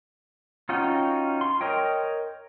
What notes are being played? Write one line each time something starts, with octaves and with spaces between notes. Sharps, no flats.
C#4 D#4 F4 F#4 G5
C6
A#4 C#5 D#5 G5